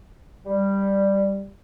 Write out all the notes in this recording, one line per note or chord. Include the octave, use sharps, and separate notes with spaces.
G3